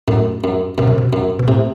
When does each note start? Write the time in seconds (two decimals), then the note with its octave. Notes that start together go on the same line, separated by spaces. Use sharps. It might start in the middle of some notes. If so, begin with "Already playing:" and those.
0.08 F#2 A2
0.44 F#2
0.78 F#2 B2
0.87 C3
0.98 B2
1.13 F#2
1.39 B2
1.48 A2 C3